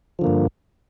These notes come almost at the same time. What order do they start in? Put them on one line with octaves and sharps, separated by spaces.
F3 D3 A#3 G2